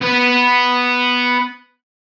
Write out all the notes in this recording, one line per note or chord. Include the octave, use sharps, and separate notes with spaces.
B3 B4